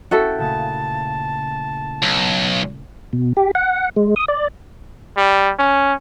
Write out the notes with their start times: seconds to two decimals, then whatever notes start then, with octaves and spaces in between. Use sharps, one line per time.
0.11 C#4 E4 F#4 A4 E5 G5
0.38 A#2 C#3 A3 A5
2.02 B1
3.13 B2
3.37 G4
3.55 F#5
3.96 G#3
4.16 D#6
4.28 D5
5.17 G3
5.59 C#4